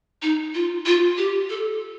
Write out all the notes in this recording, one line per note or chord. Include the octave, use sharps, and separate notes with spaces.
D#4
F4
F4
G4
A4